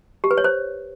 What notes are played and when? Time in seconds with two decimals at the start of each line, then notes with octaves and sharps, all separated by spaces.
0.24 G4
0.31 B4
0.38 C#5
0.44 C5